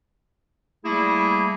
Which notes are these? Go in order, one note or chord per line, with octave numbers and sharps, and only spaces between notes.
G3 A3 A#3 E4 G#4